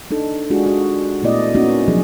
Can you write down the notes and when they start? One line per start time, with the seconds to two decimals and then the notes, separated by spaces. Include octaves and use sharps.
0.11 D4 D#4 A4
0.50 G#3 D4 F4 F#4 G#4
0.66 F#4
1.22 A#2 A3 B3 E4 D5 D#5
1.55 A#3 B3 C#4 D#4 F#4
1.88 C3 F3 F#3 G#4